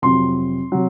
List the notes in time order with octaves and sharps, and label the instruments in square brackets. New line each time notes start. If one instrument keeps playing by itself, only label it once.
[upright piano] F2 C3 F#3 C6
C3 F#3